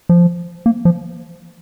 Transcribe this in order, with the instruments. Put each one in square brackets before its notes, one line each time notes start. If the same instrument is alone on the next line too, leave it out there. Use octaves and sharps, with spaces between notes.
[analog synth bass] F3
A#3
F3